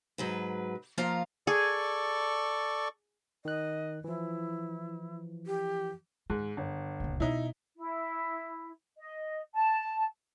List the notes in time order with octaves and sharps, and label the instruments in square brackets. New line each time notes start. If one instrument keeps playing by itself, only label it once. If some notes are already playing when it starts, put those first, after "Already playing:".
[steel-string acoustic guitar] G#2 F#3 B4
F3 A#3 F4 F5 A#5
[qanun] G#4 [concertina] A4 D5 C#6
[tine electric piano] D#3 F#6 [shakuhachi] D#5
[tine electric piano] E3 F3 [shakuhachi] E4
[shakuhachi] G4
[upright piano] G#2 [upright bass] D#3
[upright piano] G1
[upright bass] D#1 C#2
[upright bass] B2 [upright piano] D#4 E4
[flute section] E4
D#5
A5